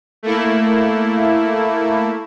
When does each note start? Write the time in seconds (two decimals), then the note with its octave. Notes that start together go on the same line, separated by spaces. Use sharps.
0.23 A3 A#3 E4